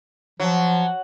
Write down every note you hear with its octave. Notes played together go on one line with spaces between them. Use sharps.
F3 F#3